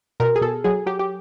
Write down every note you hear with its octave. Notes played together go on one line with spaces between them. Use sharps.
B2 A#4
G#4
B2 A4
F#3 G#4
F#3 G4
G4